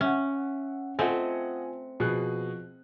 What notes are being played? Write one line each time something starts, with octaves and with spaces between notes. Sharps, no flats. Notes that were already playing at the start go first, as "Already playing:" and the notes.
C#4 E5 F#5
A3 C4 F4 D#5 F#5 G#5
B2 F3 G#4 F#6